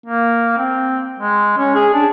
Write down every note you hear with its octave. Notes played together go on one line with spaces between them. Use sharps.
A#3
C4
G#3
C#4
G#4
D4